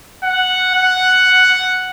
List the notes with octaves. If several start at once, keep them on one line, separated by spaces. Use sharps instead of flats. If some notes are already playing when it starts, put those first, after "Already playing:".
F#5
F#5